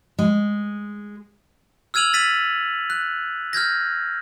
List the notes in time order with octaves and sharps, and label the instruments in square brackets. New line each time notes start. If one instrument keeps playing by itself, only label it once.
[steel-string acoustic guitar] G#3
[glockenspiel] E6 F6 G#6 D#7 F7 F#7
A6 B6 D#7 F#7
F#6
F6 G6 G#6 A#6